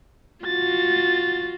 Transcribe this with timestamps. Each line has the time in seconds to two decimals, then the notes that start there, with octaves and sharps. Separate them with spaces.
0.45 F4 F#4 A6